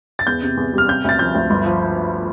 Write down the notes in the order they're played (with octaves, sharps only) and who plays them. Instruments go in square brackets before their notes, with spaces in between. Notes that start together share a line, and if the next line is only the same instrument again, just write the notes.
[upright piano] A6
E2 G6
C3
E2
G3 F6
C3 G6
D2 A6
F3 G6
D2
G1
F3